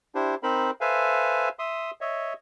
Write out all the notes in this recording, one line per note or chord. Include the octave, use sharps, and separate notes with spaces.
D4 E4 G4 C5
C4 D#4 A#4 C5 B5
A4 B4 C5 E5 F5 G#5
E5 C6 D#6
C#5 D#5 E5